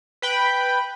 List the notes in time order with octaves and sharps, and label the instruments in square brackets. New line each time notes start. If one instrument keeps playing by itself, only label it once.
[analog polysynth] B4 G5 B5